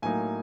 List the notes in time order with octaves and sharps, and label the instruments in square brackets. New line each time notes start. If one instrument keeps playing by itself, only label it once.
[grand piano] A2 F#3 A#3 D#4 G#5